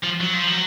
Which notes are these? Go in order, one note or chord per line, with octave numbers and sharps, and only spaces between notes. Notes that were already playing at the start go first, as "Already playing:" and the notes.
F3
F#3
F3
F#3